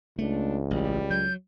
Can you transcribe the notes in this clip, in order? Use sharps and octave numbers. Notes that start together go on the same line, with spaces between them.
C#2 A3 D4
A1 G3
F#3 G6